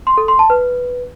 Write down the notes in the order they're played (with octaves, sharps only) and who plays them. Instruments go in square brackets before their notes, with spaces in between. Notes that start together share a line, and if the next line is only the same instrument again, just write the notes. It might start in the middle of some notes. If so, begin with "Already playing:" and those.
[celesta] C6
A4
C6
A5
B4